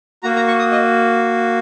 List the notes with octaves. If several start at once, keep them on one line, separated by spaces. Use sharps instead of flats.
A#3 F#4 A#5
A#5
C#6
D#6
D#5